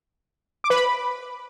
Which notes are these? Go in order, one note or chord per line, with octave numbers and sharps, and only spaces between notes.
D6
B4
B5